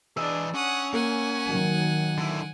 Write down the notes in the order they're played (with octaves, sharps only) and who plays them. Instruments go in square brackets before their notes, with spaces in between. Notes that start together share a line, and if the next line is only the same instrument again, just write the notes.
[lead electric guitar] E3 D#5 [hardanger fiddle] D4 G#4 [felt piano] E6
[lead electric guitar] C#4 [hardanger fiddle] F#5 D#6
[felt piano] A#3 [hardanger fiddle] F#5 G#5
[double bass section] D#3 F#3
[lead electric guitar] D3 E4